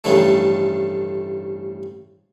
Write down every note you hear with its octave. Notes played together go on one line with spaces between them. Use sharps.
A1 G2 C#3 F3 A3